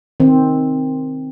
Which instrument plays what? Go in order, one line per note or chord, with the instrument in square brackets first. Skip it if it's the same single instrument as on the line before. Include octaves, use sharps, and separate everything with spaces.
[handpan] D#3 C4